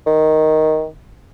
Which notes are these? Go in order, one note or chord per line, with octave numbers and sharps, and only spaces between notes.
D#3